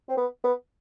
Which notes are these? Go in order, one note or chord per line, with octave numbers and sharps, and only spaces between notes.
C4
B3
B3